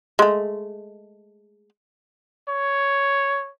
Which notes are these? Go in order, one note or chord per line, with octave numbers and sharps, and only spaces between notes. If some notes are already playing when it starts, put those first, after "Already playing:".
G#3 A3
C#5